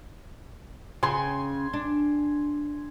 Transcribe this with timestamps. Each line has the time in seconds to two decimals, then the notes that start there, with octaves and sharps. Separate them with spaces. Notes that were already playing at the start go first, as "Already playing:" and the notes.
1.03 C#3 C#4 G#5 C6
1.73 D4